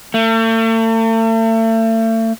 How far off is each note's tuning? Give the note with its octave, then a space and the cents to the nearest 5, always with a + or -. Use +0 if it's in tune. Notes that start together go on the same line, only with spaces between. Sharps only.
A3 +40